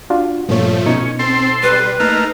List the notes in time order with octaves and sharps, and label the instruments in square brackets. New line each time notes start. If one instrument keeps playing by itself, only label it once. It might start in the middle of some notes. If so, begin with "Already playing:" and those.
[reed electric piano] D4 F4 F#4
[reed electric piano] G2 A#2 C#5 [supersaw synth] F3 A3
[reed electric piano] B2 D#4 [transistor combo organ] C#4
[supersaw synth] C4 [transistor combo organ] A4 C6
[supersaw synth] G3 [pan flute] B4
[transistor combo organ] A3 A#3 F6 [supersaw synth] D#4